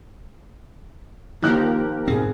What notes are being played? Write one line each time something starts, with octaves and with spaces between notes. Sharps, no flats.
D#3 F3 A#3 G4 A#4 F#6
G#2 B2 C4 G#4